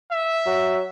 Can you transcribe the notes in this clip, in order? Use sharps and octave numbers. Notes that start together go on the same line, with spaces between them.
E5
F#3